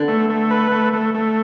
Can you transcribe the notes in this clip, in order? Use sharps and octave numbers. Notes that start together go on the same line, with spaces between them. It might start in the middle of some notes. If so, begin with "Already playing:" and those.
Already playing: D3 B3
A3
A3
B4
A3
A3
A3